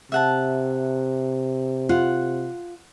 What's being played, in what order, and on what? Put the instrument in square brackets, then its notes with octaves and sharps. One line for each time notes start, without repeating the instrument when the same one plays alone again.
[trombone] C3 [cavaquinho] E5 F#5 A5
[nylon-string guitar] F4 [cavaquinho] F#5